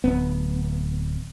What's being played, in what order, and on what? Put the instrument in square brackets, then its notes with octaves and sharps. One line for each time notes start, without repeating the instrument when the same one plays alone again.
[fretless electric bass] D1 B3